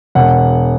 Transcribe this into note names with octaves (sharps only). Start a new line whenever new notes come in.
E1 F#5